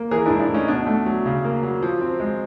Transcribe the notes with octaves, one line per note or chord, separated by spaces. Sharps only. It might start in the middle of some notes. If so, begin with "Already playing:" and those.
Already playing: A#3
E3 G#4 A#4
G#2 D4 E4
D4 E4
A3
C#4 D#4
B2 D4
A3
F#3
C#3
A#3
F#3
F3
C4
G#3